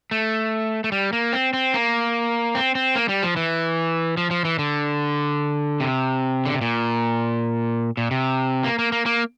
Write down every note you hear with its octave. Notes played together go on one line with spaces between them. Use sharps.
A3
A3
G3
A#3
C4
C4
A#3
C4
C4
A#3
G3
F3
E3
F3
F3
E3
D3
C3
D3
C3
A#2
A#2
C3
A#3
A#3
A#3
A#3